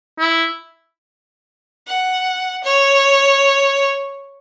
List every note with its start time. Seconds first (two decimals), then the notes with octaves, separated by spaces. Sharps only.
0.19 E4
1.88 F#5
2.64 C#5